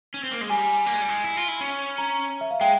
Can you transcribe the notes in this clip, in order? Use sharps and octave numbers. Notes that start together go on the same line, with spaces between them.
C#4
C4
A#3
G#3
G3 G#5
A#3
G#3
G3
G#3
E4
F4
E4
C#4
A#5
E5
F5
G#3 G5